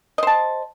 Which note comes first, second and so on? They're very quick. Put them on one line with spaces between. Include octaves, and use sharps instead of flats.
D#5 C5 A5